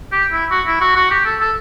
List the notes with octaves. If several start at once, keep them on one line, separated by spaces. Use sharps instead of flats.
G4
E4
F#4
E4
F#4
F#4
G4
A4
A4